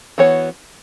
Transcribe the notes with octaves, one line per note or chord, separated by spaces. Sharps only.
E3 B3 F#4 C#5